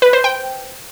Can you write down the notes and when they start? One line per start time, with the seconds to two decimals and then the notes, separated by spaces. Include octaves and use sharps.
0.02 B4
0.13 C5
0.24 G5